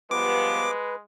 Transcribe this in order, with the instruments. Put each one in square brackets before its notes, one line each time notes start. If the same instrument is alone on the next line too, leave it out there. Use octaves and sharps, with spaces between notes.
[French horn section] F3 G3 B3 [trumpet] G#3 [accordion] B4 [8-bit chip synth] D6